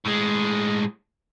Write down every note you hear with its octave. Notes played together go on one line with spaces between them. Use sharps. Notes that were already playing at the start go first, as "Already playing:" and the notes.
A2 G#3